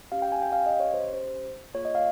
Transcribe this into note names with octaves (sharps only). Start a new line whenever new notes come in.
C#4 G4 F5
G5
G#5
G5
F5
D#5
C#5
C5
C5
A#3 F4 G#4 C#5
D#5
F5